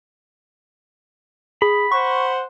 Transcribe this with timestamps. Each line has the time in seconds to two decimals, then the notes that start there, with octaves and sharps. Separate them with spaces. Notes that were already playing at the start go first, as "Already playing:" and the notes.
1.62 G#4 B5
1.92 C5 F#5 C#6